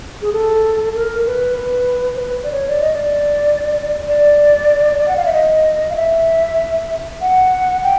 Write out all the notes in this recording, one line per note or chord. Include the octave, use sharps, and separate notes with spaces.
G#4
A4
A#4
B4
B4
C5
B4
D5
C#5
D5
D#5
D5
D5
F#5
F5
E5
D#5
F5
E5
F#5
G5